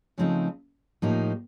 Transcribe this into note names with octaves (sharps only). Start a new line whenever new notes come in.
C#3 F3 A3 C4 D#4
A2 F3 A#3 D#4 G4